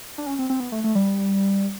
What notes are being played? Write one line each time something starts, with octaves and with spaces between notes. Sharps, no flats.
D4
C#4
C4
C4
B3
A3
A3
G3